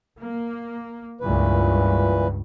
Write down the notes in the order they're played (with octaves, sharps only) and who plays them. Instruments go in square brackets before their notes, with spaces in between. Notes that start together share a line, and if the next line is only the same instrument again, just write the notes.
[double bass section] A#3
[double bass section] C#2 G2 [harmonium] A#2 E3 B4